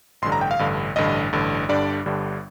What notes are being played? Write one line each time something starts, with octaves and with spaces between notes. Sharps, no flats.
A1 G2 D3 C6
A#5
G5
F5
A1 G2 D3
A1 G2 D3 D#5
A1 G2 D3
G1 G2 D3 G3 D4 D5
G1 G2 D3 G3 D4